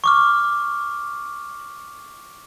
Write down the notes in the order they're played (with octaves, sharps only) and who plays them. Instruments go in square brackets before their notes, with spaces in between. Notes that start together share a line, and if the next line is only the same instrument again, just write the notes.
[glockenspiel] C#6 D6 F6